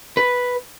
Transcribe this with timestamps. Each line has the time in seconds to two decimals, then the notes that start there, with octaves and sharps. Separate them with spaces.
0.17 B4